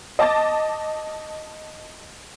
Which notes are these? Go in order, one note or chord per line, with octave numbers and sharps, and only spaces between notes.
D#5 A5 D6 A6